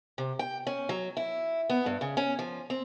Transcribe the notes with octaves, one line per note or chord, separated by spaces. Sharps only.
C3
G5
C#4
F#3
E4
B3
G2
C#3
C#4
F3
C4